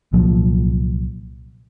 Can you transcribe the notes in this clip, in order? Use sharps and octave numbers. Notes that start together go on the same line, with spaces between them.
C2 A#2 F3 F#3